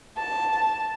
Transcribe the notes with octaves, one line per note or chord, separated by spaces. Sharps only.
A5